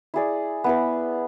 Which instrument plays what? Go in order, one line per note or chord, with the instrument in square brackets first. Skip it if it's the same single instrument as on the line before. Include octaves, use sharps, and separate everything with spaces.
[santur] E4 G#4 D5
B3 E4 B4